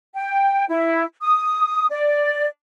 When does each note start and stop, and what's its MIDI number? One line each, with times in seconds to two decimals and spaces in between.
0.15 0.65 79
0.69 1.04 64
1.21 1.86 87
1.90 2.45 74